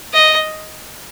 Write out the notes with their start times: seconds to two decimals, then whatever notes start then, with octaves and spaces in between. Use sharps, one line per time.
0.14 D#5